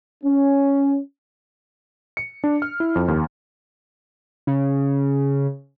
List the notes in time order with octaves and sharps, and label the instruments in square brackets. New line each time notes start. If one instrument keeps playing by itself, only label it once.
[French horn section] C#4
[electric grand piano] C#7
D4
F6
E4
F2
D#2
[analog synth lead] C#3